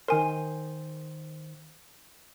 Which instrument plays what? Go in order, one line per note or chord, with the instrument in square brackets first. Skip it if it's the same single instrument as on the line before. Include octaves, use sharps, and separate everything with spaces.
[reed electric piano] D#3 C5 [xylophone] A#4 G#5